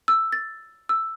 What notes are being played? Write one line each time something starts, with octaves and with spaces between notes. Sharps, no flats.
E6
A6
E6